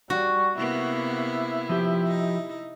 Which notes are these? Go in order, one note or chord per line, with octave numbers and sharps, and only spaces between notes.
G3 F#4
C3 A#3 B3 E4
F3 G4
D#4